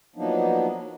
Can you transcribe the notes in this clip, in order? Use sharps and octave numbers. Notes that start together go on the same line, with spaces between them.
F3 F#3 A#3 B3 D4 D#4